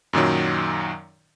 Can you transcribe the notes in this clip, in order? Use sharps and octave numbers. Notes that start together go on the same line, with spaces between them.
F#2 A#2 D#3 F#3